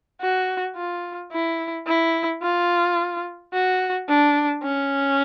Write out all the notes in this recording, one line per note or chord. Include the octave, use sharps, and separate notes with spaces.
F#4
F4
E4
E4
F4
F#4
D4
C#4